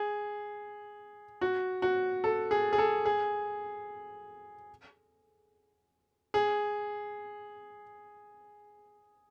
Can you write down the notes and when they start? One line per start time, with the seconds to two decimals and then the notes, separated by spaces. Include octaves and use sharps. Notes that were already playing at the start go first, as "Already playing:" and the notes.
Already playing: G#4
1.41 F#4
1.82 F#4
2.24 A4
2.51 G#4
2.73 G#4
2.78 A4
3.05 G#4
6.34 G#4